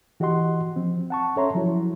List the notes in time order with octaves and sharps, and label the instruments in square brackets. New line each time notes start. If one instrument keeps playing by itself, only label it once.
[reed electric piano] E3 F#4 G4 D#5 F#5 C6
F3 C4
F#5 A5 C#6
C#4 A4 C#5 E5 A#5 C6
F3 F#3 E4 F#4